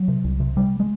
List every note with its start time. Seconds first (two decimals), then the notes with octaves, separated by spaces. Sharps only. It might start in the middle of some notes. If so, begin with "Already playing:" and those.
Already playing: F#3
0.08 C3
0.24 C2
0.40 C3
0.56 C3 G3
0.80 G#3